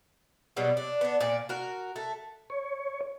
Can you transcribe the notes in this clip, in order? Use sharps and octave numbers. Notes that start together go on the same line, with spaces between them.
B2 F#3 G3 B3
D4
B3 D4
A#2 D5
F#4 A#4
A3
C#5